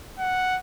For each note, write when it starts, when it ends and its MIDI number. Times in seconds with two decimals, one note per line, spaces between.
0.19 0.57 78